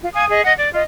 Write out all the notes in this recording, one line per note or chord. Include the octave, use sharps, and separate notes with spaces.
F4
F5 G#5 D#6
G#4 D#5
D#5 F#5
D5
F4 D#5